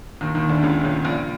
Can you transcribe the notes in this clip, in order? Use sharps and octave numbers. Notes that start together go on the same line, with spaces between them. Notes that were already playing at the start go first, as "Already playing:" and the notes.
D#2 D#3
D#2 D#3
D2 D3
C#2 C#3
C#2 C#3
A#1 A#2